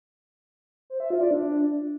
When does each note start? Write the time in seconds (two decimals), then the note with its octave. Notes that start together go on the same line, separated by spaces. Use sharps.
0.90 C5
1.00 E5
1.10 F4
1.21 D5
1.31 D4